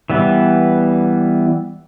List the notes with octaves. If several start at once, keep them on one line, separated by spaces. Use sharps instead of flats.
E3 G3 B3